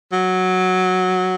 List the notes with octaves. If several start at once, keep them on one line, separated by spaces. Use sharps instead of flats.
F#3